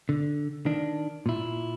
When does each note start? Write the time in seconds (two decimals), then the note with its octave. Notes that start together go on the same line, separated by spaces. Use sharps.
0.09 D3
0.66 D#3 D4
1.26 A#2 E4